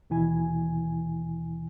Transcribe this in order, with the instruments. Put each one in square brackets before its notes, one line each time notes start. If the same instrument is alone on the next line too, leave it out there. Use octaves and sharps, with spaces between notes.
[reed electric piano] D#2 B2 E3 E4 G#5